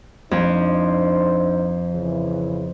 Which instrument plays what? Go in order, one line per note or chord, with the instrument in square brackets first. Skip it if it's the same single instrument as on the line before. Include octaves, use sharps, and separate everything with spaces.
[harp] F2 [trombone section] D4 D#4 C5
[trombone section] C#3 E3